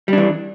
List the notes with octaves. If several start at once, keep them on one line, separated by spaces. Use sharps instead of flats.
E3 G3 D4